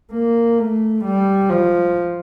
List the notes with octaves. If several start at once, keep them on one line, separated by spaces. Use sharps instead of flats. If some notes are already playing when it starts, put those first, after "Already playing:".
A#3
A3
G3
F3